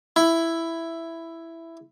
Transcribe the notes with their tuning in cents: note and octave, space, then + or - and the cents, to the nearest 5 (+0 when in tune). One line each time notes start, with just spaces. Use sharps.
E4 +5